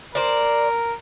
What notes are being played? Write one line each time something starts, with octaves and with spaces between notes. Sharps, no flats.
A#4 C5 D5